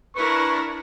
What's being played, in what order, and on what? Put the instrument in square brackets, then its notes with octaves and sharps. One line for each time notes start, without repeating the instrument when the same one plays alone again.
[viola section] D4 E4 A#4 [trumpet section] B4 C#6